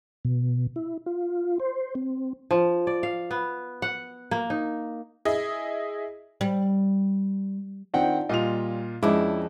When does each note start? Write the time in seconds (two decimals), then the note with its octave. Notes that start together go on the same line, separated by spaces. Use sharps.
0.25 B2
0.76 E4
1.06 F4
1.60 C5
1.95 C4
2.51 F3
2.87 D5
3.03 F5
3.31 B3
3.82 F#5
4.31 A#3
4.50 D#4
5.25 E4 G#4 D#5
6.41 G3
7.94 D#3 C4 D4 F4 D5 F#5 G5
8.29 A#2 G3 F4 D#5 F7
9.03 F2 G#3 C#4 D4 E4 D#5 D6